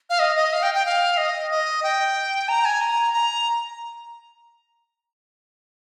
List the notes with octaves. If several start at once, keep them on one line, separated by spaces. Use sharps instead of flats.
F5
D#5
D#5
F5
G5
G5
F5
D#5
D#5
G5
A#5
G#5
A#5
A#5